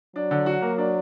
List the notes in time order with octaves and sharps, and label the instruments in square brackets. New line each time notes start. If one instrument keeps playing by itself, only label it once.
[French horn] F#3 [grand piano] D4
[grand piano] D3
F#4
A#3
D4